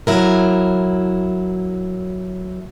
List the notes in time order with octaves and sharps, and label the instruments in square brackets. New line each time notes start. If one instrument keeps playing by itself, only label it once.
[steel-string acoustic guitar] F#3 E4 A#4